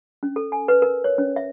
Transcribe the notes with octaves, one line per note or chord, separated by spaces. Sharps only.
C#4
A4
G#5
B4
A#4
C#5
C#4
E5